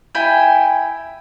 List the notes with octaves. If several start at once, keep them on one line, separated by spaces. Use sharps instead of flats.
E4 G5 G#5